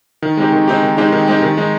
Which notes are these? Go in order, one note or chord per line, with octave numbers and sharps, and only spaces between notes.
D#3
G#3 C4 D#4 G4
D#3
G#3 C4 D#4 G4
D#3
G#3 C4 D#4 G4
D#3
G#3 C4 D#4 G4
D#3
G#3 D#4